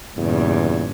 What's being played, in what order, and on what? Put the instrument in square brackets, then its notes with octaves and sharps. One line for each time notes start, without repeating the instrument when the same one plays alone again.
[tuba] E2 [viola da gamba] G2 A#2 C#3